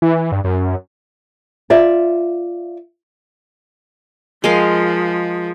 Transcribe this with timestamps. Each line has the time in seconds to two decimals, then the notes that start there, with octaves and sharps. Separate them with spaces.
0.02 E3
0.32 G2
0.44 F#2
1.70 F4 D5 E5
4.44 F3 G#3 A#4 F5